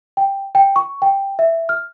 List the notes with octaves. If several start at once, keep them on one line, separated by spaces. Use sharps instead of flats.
G5
G5
C#6
G5
E5
F6